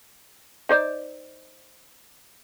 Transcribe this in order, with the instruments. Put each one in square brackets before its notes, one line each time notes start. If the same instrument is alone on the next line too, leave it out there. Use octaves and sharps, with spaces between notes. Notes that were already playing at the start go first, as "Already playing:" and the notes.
[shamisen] D#4 C5 D5